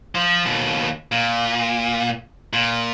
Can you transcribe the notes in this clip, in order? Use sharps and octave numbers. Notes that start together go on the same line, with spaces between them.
F3
D#2 B2
A#2
A#2